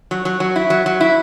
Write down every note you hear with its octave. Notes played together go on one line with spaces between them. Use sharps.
F#3
F#3
F#3
E4
F#3
F#3
E4